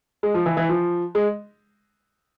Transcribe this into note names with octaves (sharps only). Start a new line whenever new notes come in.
G#3
F3
E3
E3
F3
G#3